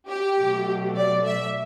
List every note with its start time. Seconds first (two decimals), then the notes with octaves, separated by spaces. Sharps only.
0.08 G4
0.37 B2 F#3 A3
0.96 D5
1.25 E5